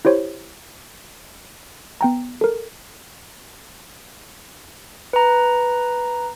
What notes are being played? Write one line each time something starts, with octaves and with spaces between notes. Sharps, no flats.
E4 G4 C5 C#5
B3 G5 A#5
A4 A#4
B4 A#5